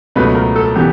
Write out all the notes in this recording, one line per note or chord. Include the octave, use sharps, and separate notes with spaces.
C#2 B2 F#3 A3 B4
A#4
A4
C#3 E3 G3 B3 G4